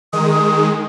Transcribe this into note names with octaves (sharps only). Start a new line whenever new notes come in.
D#3 G#3 D#6